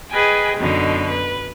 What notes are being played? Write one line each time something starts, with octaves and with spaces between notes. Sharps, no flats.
G#4 B4 D#5 G5 G#5
F#2 B2 D3 D#4
B4